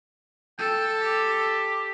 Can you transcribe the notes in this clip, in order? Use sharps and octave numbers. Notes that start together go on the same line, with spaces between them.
A4 G5
G4